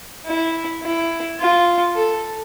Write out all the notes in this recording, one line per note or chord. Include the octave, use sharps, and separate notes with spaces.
E4
E4
F4
A4